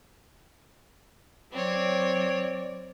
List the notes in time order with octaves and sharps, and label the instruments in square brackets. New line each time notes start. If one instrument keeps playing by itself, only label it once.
[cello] F#3 D5 [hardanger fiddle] C4 C#5